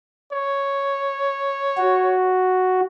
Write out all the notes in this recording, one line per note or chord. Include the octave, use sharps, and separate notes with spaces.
C#5
F#4